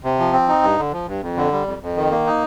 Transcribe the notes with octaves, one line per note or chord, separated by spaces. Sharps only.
C3
F3
C4
D#4
G2
D3
F3
G2
F2
D3
G3
F2
F2
D#3
A#3
D#4